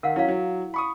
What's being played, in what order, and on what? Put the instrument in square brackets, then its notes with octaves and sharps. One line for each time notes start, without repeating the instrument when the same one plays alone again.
[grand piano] D#3 [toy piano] A#4 F5 F#5
[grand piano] F#3 C#4 [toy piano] E4 F5
[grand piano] F#3
B5 C#6 D#6